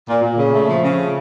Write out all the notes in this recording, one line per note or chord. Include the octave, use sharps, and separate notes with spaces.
A#2
A#2
C#3
A3
F3
C#3